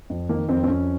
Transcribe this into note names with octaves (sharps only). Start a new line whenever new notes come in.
F2
D#3 A#3
F2 C4
C4
F2 C#4